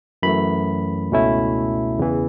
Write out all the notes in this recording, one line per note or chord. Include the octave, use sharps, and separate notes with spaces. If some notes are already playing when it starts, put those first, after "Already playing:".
F#2 E3 A3 B5
C#2 B2 A3 C#4 E4
E2 C#3 E3